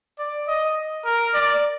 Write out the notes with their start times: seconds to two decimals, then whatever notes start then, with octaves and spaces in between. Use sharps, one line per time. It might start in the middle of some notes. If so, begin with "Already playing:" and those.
0.19 D5
0.47 D#5
1.06 A#4
1.34 D5